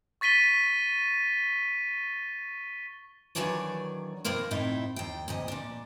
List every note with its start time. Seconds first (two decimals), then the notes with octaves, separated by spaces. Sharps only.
0.21 C#6 A6 B6 D#7 G7
3.35 D#3 E3 F#3 D4 C#5 D5
4.25 B2 D#3 A#3 A#4 C5
4.51 A2 C3 D#4 E4
4.96 D#2 G5
5.28 D2 A#2 D#5
5.48 A#2 D4